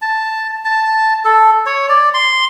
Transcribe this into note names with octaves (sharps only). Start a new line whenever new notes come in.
A5
A5
A4
C#5
D5
C6